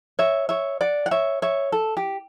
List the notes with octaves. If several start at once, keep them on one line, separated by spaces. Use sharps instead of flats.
C#5 E5
C#5 E5
D5 F#5
F#5
C#5 E5
C#5 E5
A4
G4